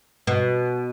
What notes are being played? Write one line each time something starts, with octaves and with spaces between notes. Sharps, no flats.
B2